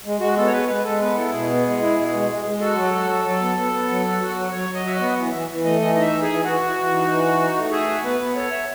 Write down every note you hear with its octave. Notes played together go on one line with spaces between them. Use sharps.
G#3
G#3 F#4
B3 A4
C#5
G#3 B4
G#3 B4
G#3 A4
B3 B4
E4 A4
B2 G#4
B3
G#3
E4
B2
G#3
G#3
G#3
F#4 A4
F#3
F#4
F#3
F#3
B3
B3
B3
F#3
F#4
F#4
F#3
F#3 C#5
F#3
D#5
F#4 E5
B3 D#5
E3
E3 E5
E3
A3 D#5
E3 D#5
D#4 D#5
E5
E3
G#4
E3
E3 F#4
E3
E3
D#4
E3
D#4
D#4
A3
G#4 E5
F#4
B3 B4
B3
A4 C#5
E5